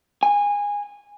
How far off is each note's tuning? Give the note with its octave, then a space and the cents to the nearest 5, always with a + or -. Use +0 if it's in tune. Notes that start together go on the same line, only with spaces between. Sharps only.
G#5 -20